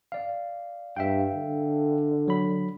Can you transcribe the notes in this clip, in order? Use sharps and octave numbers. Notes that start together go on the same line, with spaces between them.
D5 F5
G2 E5 F5 G5
D3
F#3 B5